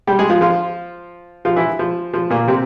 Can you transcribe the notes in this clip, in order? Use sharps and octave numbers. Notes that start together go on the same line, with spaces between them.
G3 G4
G#3 G#4
F3 F4
F3 F4
F3 F4
E3 E4
F3
F3
A#2 A#3
C3 C4